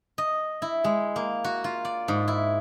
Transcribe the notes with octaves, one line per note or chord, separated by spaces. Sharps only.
D#5
E4
G#3
A#3
F#4
F4
D5
G#2
E4